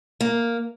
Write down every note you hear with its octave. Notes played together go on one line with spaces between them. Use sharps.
A#3